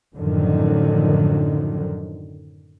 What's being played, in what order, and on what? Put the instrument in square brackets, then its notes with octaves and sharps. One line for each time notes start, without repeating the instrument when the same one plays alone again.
[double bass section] F#2 A2 D3 D#3 F3 F#3